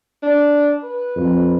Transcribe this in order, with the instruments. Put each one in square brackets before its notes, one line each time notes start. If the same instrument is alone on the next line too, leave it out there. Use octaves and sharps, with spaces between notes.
[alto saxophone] D4
B4
[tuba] F2